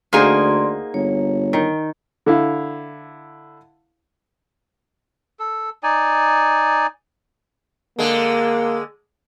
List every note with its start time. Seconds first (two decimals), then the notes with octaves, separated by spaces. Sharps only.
0.13 D2 A#3 D#4 F#4 G#4 C5 D5 C6
0.94 G1 C#5
1.53 D#3
2.26 D3 E4 F5
5.40 A4
5.83 D#4 D5 G#5
7.99 D3 G#3 A#3